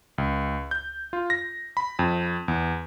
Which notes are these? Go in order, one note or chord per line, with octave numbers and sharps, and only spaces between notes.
C#2
G6
F4
A#6
B5
F2
E2